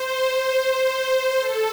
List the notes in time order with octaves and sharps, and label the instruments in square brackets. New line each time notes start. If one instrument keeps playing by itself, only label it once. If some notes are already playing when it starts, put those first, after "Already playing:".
Already playing: [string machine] C5
A4